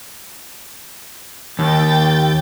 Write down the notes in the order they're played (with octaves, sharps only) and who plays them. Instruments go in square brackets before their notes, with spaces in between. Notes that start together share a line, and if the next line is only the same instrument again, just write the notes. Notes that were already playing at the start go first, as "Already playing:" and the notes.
[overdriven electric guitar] D#2 [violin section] G5 G6 A6